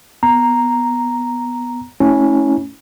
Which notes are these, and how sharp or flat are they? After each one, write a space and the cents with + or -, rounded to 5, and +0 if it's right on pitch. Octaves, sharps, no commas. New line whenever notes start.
B3 +0 A#5 +0
A3 +0 C#4 +0 E4 -35